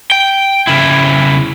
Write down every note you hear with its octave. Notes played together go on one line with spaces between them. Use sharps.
G5
C#3 E4